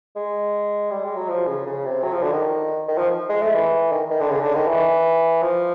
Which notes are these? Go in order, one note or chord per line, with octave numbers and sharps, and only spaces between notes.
G#3
G3
G#3
F#3
F3
C#3
C#3
C3
F#3
F3
D3
D#3
D#3
F3
G#3
A3
E3
D#3
D#3
D3
C#3
D3
D#3
E3
F3